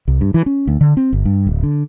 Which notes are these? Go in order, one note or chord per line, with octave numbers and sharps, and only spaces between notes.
C2
G2
E3
C#4
D2
D3
C4
G1
G2
D1
D3